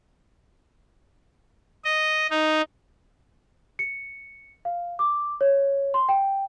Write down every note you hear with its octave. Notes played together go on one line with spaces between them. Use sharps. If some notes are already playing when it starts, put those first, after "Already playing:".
D#5
D#4
C#7
F5
D6
C#5
C6
G5